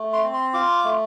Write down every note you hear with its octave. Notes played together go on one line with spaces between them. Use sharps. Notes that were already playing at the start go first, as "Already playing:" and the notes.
Already playing: A3
C6
C4
C6
F4 D6
A3